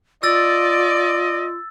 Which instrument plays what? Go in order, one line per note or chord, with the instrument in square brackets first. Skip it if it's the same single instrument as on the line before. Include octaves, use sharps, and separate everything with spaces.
[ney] F4 [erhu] D5 [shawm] D#5 [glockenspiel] E6 A6